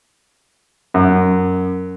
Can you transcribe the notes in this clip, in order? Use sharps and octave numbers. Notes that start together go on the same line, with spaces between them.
F#2